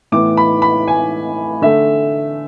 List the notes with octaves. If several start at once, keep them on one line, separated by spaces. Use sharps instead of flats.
A2 E3 B3 D6
B5
B5
G#5
D3 A3 E5